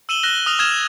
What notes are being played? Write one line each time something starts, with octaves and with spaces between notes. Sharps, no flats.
E6 D#7 E7 F#7 G7
F6 F#6 A#6 E7 G7
D#6 F6 A#6 F7
D#6 F6 G#6 E7 F7